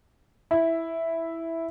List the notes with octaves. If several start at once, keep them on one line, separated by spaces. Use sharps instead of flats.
E4